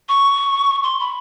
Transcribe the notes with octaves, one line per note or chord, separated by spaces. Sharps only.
C#6
C6
B5